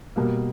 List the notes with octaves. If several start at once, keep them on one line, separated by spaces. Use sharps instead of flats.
B2 G3 A#3